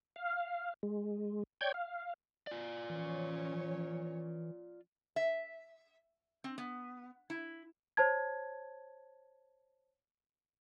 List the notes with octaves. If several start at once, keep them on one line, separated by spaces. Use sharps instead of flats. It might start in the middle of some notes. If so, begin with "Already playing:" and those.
F5
G#3
C#5 D5 G5 G6 G#6
F5
F4 D5
E3 F3 C#4 C#5
E5
C4
B3
E4
C5 C#5 A5 G#6